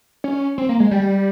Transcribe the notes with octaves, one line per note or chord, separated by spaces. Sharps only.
C#4
C4
A#3
G#3
G3